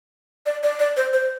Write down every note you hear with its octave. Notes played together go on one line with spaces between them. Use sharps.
D5
D5
D5
C5
C5